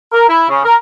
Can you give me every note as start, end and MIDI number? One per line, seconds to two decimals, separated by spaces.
0.13 0.24 70
0.29 0.47 64
0.50 0.60 49
0.64 0.74 70